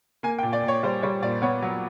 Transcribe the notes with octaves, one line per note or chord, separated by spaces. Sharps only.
A#3 G#5
G5
A#2
D5
A#2
C#5
G3 C5
G3 C#5
A#2 D5
B3 C#5
F#3